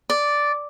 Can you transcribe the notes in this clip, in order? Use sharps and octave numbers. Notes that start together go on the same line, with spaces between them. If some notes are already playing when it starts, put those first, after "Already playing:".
D5